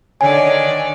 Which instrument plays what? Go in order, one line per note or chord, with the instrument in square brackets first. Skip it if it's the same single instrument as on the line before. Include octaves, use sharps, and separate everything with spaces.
[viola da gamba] D3 D#3 D5 [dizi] C#5 [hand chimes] G#5